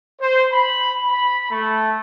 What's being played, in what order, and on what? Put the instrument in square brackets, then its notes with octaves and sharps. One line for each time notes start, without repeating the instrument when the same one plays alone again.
[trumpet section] C5
B5
B5
A3